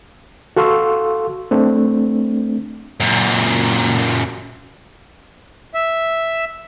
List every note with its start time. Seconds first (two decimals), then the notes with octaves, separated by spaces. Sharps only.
0.57 F#4 A4 F5 C6 C#6 E6
1.51 A3 C4 D4
3.00 F#2 A#2
5.74 E5